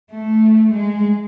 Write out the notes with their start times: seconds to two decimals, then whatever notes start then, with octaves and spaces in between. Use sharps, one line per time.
0.11 A3
0.73 G#3